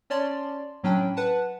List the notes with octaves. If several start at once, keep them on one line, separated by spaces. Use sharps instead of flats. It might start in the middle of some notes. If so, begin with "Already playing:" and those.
C#4 C#5 D5 A5 C6
A2 F#3 C#4 D4 G5 B5
B4 F#5 A5